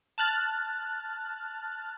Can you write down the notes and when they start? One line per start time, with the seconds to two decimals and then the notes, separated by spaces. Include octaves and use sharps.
0.18 A5 F6 F#6 A6